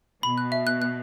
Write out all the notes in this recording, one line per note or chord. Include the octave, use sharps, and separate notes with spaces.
B2 B5
F#6
E5
F#6
F#6